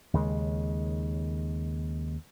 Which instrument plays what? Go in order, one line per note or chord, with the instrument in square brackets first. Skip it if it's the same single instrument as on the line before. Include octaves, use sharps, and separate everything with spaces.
[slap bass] D#2 C#3 G#3